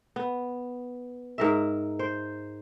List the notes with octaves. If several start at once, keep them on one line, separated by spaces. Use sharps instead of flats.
B3
G#2 A#4 E5
C5